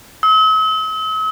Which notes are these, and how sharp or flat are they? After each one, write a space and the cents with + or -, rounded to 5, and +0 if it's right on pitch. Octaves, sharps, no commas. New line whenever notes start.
E6 -45